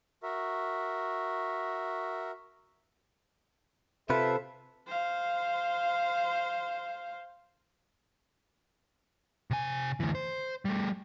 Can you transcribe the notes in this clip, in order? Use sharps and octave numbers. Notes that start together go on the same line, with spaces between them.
F#4 A#4 E5
C3 F4 A4 B4 C5 E5
C5 F5
C3 G#5
D2 E3
C5
G3 A3